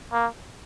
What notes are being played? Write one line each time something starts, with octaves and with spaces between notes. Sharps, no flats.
A#3